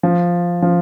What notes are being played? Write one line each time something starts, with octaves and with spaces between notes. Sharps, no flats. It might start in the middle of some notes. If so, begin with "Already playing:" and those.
F3
F3